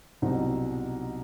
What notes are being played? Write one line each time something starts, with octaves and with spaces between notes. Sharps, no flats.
C2 B2 F#3 C4 D#4